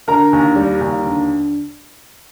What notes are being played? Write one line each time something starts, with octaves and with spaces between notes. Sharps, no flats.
D3 A#4 A#5
D#2
G3
D#2
D3